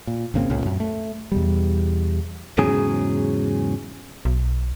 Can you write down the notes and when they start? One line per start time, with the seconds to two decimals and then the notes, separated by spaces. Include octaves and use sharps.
0.07 A#2
0.34 G#1 C#3 A#3 C4
0.50 C#2 A#2 C#3
0.66 F#2
0.80 A3
1.32 E2 B2 G3
2.58 E2 G#2 C#3 F#3 G#4
4.25 B1